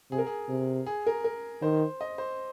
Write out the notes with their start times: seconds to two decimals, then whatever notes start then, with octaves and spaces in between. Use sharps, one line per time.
0.11 C3 G#4
0.18 A#4
0.27 G#4
0.49 C3
0.86 G#4
1.07 A#4
1.24 A#4
1.62 D#3 C5
2.01 D#5
2.18 C5